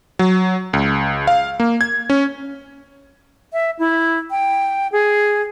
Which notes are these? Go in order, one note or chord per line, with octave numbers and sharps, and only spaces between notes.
F#3
C#2
F5
A#3
G#6
C#4
E5
E4
G5
G#4